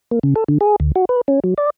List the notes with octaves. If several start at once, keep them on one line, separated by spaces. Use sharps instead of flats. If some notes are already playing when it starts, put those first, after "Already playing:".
A#3
C#3
A4
D3
G#4
D2
F#4
B4
C#4
F#3
D5